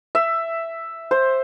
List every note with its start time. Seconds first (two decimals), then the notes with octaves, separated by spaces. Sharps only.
0.15 E5
1.11 C5